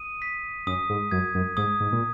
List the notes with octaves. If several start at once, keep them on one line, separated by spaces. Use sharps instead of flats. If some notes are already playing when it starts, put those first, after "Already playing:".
Already playing: D#6 D#7
B6
F#2 D#6
G#2
F#2 G#6
F#2
G#2 D#6
G#2
A#2